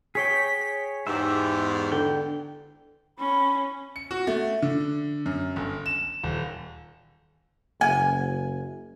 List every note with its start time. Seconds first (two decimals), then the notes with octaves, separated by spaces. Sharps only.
0.15 G#4 C#5 G5 B6
1.07 E2 G#2 G4 E5
1.92 D3 G5
3.18 C#4 B5
3.96 C#7
4.11 F#4
4.27 A3
4.62 D3
5.26 F#2
5.56 G1
5.86 E7
6.23 D#1
7.81 F#1 G#5